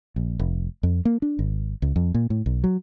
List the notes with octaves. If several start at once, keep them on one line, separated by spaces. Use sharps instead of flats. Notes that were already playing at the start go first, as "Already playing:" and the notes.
A#1
F1
F2
A#3
D4
G#1
C#2
F2
A#2
A2
B1
F#3